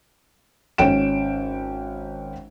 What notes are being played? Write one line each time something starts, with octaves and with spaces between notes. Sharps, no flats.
G#1 C#4 G5 D7 E7